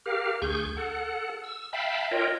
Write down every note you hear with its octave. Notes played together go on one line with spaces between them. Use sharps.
G4 A#4 F5
D2 G#4 C#6 G6
A4 F#5
E6
E5 F5 G5 A5 B5
F4 A#4 C#5 D#5 G5